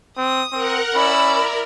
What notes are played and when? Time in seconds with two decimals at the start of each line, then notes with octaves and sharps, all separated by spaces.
0.17 C4 D#6
0.53 C4 A#4 F#5
0.94 C#4 E4 D5 B5 E6
1.29 A#4